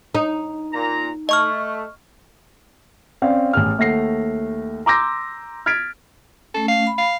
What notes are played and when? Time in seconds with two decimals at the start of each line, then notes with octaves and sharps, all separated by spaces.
0.15 D#4
0.73 A#2 A#5
1.29 A3 D#5 C#6 F6
3.22 C4 C#4 D5 F5
3.53 A1 G#4 F6
3.78 D#2 A3 F#5 A#6 C7
4.86 A#5 C6 D6 E6 G6 A#6
5.66 F6 G#6 A6 B6 D7
6.55 A3 C#4 A4
6.68 F5
6.87 B5
6.98 F5